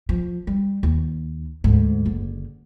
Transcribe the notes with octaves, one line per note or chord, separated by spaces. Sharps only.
F3
G3
D#2
D2 G#2
F#1 D3